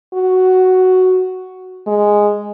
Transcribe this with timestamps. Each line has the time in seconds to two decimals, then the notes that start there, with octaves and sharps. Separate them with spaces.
0.14 F#4
1.87 G#3